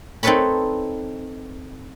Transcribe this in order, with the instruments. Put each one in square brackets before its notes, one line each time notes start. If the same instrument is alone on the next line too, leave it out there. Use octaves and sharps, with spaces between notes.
[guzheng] C4 D#4 A4 B4 C#5 B5